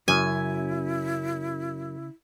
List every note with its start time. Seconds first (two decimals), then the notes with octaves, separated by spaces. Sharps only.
0.08 F#2 C#3 E4 G#5